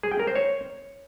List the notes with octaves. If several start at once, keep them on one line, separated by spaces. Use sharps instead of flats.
G#4
G5
A#4
C5
C#5